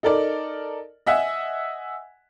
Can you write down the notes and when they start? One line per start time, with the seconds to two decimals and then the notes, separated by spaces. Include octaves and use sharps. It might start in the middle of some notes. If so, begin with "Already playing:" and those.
0.03 D#4 A4 A#4 D5
1.06 D#5 E5 F#5 G#5 E6